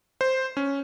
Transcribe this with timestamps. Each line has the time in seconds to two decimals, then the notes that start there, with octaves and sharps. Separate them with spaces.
0.21 C5
0.57 C#4